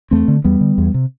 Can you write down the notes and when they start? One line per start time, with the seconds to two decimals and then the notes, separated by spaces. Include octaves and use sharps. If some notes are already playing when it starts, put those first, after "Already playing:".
0.11 E2 A3 C4
0.28 D3
0.44 E2 G3 B3
0.61 D3
0.78 E2
0.94 C3